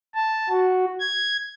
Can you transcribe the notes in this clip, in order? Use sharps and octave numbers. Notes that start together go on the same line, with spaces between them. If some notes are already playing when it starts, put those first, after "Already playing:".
A5
F#4
G#6